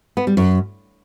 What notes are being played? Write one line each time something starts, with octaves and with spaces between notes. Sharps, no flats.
B3
G3
F#2